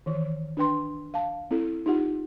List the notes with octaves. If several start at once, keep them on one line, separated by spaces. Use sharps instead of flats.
D#3 E3
D4 B4 G5 C6
F5 A5
C4 E4 A4
D#4 F4 G4 F#5